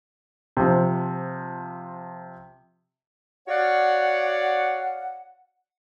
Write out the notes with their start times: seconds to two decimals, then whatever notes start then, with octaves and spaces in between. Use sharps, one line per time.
0.57 C3 F3
3.48 F#4 C#5 D5 F5 F#5